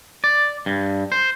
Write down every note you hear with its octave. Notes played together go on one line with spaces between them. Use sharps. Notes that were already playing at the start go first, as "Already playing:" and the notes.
D5
G2
C5